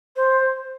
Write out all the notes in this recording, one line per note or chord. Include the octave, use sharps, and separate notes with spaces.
C5